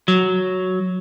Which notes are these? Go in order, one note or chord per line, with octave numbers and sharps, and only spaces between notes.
F#3